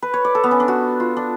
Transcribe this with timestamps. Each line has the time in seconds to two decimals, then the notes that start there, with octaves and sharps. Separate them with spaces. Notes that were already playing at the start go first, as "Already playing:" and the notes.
0.02 B4
0.14 C#5
0.25 D5
0.35 A4
0.44 B3
0.51 C#4
0.60 D4
0.68 F#4
1.00 F4
1.17 D4